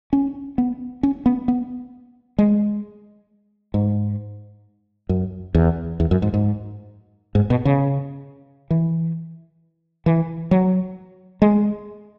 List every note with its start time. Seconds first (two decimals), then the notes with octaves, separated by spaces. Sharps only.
0.13 C#4
0.58 B3
1.03 C#4
1.26 B3
1.48 B3
2.38 G#3
3.74 G#2
5.09 F#2
5.55 E2
6.00 E2
6.11 F#2
6.22 G#2
6.34 G#2
7.35 G#2
7.50 B2
7.65 C#3
8.70 E3
10.06 E3
10.51 F#3
11.42 G#3